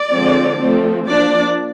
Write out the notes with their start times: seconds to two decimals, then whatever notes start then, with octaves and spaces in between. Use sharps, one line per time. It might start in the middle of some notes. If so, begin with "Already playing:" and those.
Already playing: D5
0.13 D3 F3 G#3 C4
0.60 F3 A3 C4
1.07 F3 A#3 D4 D5